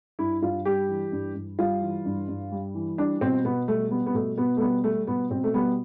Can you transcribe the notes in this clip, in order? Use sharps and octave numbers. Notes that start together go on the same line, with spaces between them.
G2 E4
G2 F4
G3 G4
E3
G2
G2
G3 F4
E3
G2
G2
G3
E3
G3 D4
B2 C4
B2 B3
G3 A3
G3 B3
B3
B2 A3
B2 B3
A3
G3 B3
G3 A3
B2 B3
B2 C4
A3
G3 B3